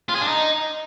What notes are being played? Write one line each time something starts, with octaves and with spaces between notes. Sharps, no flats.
F4
G#4
D4
D#4